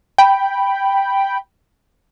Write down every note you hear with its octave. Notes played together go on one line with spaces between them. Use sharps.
G5 B5